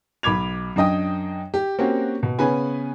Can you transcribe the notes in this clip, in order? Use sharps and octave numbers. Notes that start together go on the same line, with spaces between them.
B1 B5 D6 G#6 F7
F#2 D4 D#5 G5 D#6
G4
A#3 C4 C#4 F#4 G4 A#4
B2
C#3 B3 C#4 B4 G#5